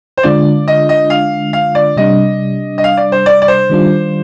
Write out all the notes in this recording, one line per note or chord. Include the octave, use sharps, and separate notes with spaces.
C5
D3 G#3 D4 F4 D5
D#5
D#5
F5
F5
D5
C3 G3 D4 D#5
D#5
F5
D5
C5
D5
D5
C5
D#3 G3 D4 F4